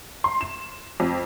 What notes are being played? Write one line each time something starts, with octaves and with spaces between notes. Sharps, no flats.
C6
E7
F2